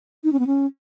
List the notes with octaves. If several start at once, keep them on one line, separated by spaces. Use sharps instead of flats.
D#4
C#4
B3
C#4